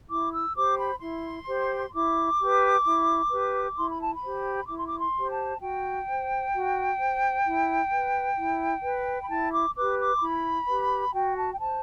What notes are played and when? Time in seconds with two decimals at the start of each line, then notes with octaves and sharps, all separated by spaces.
0.08 E4 D6
0.32 E6
0.55 G4 C5 D6
0.78 B5
1.01 E4 C6
1.47 G4 C5
1.93 E4 D6
2.39 G4 B4
2.85 E4
3.31 G4 B4
3.77 E4 C6
3.89 B5
4.02 A5
4.14 B5
4.23 G4 C5
4.68 E4 D6
4.79 C6
4.87 D6
5.00 C6
5.15 G4 C5
5.31 A5
5.61 F#4 G5
6.07 C5
6.53 F#4
6.99 C5
7.45 E4
7.92 B4
8.37 E4
8.84 B4
9.22 B5
9.29 E4 A5
9.52 D6
9.75 G4 B4 D6
9.98 D6
10.17 C6
10.21 E4 B5
10.67 G4 B4
11.13 F#4 G5
11.36 A5
11.51 G5
11.59 C5 A5